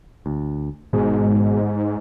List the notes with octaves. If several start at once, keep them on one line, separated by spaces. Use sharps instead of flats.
D2
G#1 G#2 B2 G#3